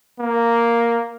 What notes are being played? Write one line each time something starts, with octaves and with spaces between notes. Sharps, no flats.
A#3